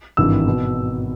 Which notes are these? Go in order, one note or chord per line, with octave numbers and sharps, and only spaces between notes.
G#1 G2 E3 E6
B2